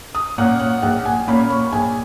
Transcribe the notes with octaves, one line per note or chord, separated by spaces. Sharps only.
D#6
A#2 A#3 C#4 F#5
F#5
A#1 F#5
G#5
A#2 A#3 C#4 B5
C#6
A#1 G#5